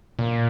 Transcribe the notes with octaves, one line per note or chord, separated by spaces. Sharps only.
A#2